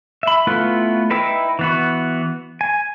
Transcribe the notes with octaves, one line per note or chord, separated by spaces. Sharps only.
E5 B5
A3 B3 E4 F4 B4
D#4 E4 B4 G5 E6
E3 B3 F#4
G#5